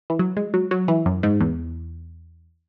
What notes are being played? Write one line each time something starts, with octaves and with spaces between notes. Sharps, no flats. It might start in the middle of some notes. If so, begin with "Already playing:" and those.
E3
F#3
G#3
F#3
F#3
E3
F#2
G#2
E2